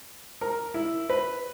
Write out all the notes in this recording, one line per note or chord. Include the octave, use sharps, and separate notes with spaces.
A#4
E4
B4